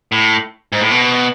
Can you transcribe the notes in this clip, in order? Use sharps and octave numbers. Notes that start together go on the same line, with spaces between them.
A2
G#2
A2
B2